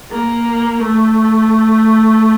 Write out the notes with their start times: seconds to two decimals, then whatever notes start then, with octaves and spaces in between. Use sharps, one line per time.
0.12 A#3
0.83 A3